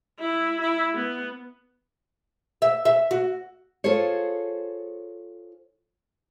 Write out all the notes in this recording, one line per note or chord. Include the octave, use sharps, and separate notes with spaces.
E4
E4
B3
E5
E5
F#4
F4 G#4 A4 C5 C#5